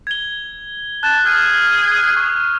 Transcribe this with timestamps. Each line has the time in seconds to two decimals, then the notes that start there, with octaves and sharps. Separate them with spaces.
0.07 G#6 G7
1.03 A5 F#6
1.25 G#4 F6 F#6 D#7
2.17 C#6 D#6